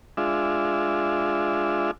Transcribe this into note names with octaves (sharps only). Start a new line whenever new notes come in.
G#3 D4 F4 E5